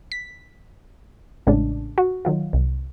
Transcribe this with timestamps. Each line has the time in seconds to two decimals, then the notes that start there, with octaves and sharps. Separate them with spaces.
0.12 B6
1.47 A1 A2 C#3 G#3 D4
1.98 F#4
2.25 D#3 F#3 F4
2.53 C2